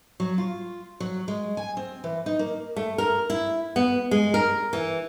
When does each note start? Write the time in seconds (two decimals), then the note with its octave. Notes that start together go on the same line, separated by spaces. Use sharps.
0.20 F#3
0.38 F4
1.00 F#3
1.28 G#3
1.57 G#5
1.77 C4
2.04 E3
2.26 D#4
2.39 A#3
2.77 A3
2.98 A#4
3.30 E4
3.76 B3
4.11 G#3
4.34 A#4
4.73 E3